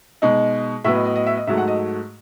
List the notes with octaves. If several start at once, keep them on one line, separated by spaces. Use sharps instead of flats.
B2 G#3 D#4
A2 F#3 B3 E5
D#5
D#5
D#5
E5
D#5
G#2 F#3 A3 E5
F#5
D#5